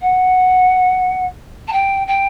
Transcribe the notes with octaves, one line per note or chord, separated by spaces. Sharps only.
F#5
A5
G5
G5